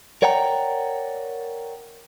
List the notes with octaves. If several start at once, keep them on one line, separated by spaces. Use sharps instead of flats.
A#4 C#5 D5 F#5 G5 A#5